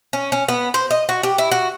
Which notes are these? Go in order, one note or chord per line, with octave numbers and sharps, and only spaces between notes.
C#4
C#4
B3
C5
D#5
F#4
G4
E4
F#4